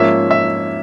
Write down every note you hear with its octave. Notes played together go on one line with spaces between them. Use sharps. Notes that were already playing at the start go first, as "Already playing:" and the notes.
Already playing: G#2 F3 A#3 C#4 E5
E5